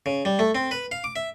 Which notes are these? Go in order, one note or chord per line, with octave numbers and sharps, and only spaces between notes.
C#3
G3
A3
C4
B4
F5
D6
E5